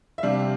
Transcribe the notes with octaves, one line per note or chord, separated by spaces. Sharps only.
E5
C3 G3 D4 F5